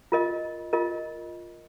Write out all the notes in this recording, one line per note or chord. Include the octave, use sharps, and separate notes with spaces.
F4 A#4 D#5
F4 A#4 D#5